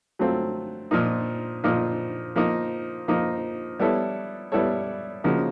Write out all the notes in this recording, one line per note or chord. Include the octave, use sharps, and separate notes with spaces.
F#3 A3 C4 F4
A#2 F3 A#3 D#4
A#2 F3 A#3 D#4
F3 A#3 D#4
F3 A#3 D#4
G3 B3 E4 A4 C#5
G3 B3 E4 A4 C#5
C#3 F3 A#3 D#4 F#4